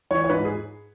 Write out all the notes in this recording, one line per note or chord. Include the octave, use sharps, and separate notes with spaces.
E3 C#5
C#5
G#2 B4
G#4